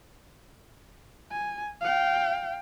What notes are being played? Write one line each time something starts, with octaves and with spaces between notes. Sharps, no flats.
G#5
F5 G5